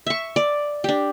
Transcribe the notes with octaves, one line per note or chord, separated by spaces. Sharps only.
E5 C#6
D5
D4 G4